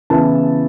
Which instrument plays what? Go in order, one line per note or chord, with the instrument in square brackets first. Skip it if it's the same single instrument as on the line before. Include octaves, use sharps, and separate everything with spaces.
[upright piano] C#3 E3 B3 E4 A5